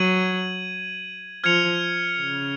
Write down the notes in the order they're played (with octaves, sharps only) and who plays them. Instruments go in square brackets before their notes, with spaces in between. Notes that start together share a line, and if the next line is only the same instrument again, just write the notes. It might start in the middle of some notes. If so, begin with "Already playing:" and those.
Already playing: [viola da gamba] F#3 [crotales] G#6 D#7 F#7
[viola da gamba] F3 [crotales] F6 G#6 C#7 F7
[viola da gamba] C#3